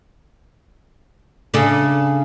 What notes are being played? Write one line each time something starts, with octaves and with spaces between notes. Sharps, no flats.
C#3 D4 A4